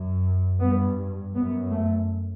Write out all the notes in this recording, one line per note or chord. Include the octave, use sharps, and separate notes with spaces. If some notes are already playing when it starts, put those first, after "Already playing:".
Already playing: F#2
G2 B3
F#2 B3
A3